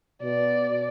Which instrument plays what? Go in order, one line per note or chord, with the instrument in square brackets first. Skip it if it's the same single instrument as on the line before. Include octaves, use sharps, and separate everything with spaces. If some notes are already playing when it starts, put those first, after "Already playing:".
[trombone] B2 [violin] D5